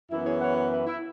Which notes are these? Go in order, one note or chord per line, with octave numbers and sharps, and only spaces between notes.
F#2 E3 B3 E4
G#4 C#5
C#5 F#5
C#5 F#5
B4 E5
E4